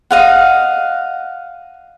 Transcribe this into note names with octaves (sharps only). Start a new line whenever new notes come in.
D#5 F5 F#5